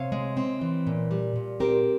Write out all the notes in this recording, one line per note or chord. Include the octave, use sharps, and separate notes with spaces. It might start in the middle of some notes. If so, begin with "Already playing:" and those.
Already playing: C3 C#5 F5
G#3
C4
E3
A#2
G3
A#2
C4 G4 A#4